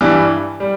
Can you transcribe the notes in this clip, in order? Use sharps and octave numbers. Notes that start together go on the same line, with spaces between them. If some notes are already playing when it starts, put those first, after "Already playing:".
G2 E3 G3
G3